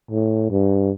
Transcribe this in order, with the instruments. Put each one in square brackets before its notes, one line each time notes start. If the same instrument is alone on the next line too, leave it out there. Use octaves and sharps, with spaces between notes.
[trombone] A2
G2